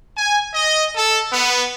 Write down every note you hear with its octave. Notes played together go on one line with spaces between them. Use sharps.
G#5
D#5
A4
B3